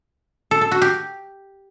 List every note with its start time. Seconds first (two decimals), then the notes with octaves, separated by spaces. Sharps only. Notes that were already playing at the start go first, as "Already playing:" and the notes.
0.51 A4
0.61 A4
0.71 F#4
0.82 G4